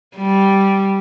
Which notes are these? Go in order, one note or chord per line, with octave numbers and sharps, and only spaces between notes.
G3